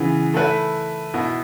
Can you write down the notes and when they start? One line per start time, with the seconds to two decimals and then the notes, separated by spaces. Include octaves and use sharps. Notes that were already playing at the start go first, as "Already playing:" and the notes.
Already playing: C#3 E3 B3
0.34 A3 E4 B4
1.14 B2 B3 E4